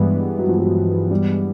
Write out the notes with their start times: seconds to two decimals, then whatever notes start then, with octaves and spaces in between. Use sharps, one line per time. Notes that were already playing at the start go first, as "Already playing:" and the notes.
Already playing: G2 E3 G3 G#3 B3
0.39 F#3
0.49 F3
0.58 F#3
1.11 G3